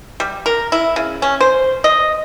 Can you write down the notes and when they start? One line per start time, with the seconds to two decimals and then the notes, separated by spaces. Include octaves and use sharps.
0.20 G3
0.46 A#4
0.72 E4
0.96 C#3
1.22 C#4
1.41 C5
1.84 D#5